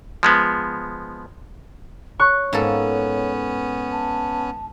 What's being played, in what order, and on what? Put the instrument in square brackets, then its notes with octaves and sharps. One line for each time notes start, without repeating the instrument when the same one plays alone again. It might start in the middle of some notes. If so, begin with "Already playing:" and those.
[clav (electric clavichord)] F3 G#3 B3
[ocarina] C#5 [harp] C#6 F#6
[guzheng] G#2 A#3 A4 [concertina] B3 C#4
[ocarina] A5